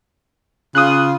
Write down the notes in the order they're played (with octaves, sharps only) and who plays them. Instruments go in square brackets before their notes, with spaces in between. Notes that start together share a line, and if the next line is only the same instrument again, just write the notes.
[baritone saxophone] C#3 [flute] F4 [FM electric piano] D#6 F#6